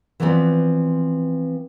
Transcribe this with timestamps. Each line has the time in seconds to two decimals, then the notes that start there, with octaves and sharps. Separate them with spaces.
0.20 E3 F3 G3 B3 C4 D4